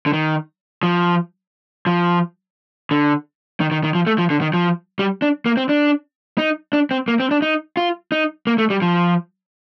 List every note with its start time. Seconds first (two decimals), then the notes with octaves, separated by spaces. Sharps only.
0.06 D3
0.13 D#3
0.83 F3
1.87 F3
2.91 D3
3.60 D#3
3.72 D#3
3.84 D#3
3.95 F3
4.07 A3
4.18 F3
4.30 D3
4.41 D#3
4.54 F3
4.99 G3
5.22 D4
5.46 A#3
5.57 C4
5.69 D4
6.38 D#4
6.73 D4
6.91 C4
7.08 A#3
7.20 C4
7.31 D4
7.42 D#4
7.77 F4
8.12 D#4
8.47 A#3
8.58 A3
8.70 G3
8.82 F3